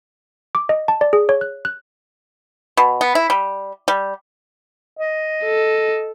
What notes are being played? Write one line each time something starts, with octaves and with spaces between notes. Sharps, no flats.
D6
D#5
A5
D5
G#4
C#5
F#6
F#6
B2
B3
E4
G3
G3
D#5
A4